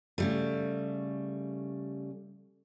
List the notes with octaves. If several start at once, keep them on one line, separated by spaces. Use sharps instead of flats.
C#3 G3 A3